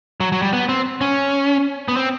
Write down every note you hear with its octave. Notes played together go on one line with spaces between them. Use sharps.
F#3
F#3
G3
B3
C4
C#4
B3
C4